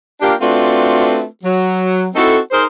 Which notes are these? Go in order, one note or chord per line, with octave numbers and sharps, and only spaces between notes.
A#3 D4 F4 G4
A3 C4 D4 F4 F#4 B4
F#3
C4 D#4 E4 F#4 A4
D#4 G#4 A#4 C5